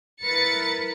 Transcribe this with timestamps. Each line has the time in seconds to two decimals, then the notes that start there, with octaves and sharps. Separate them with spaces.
0.23 E4 A#4 B4 A6 C#7